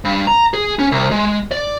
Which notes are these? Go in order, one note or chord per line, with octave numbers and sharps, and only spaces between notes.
G2
A#5
G#4
C#4
C2
G#3
D5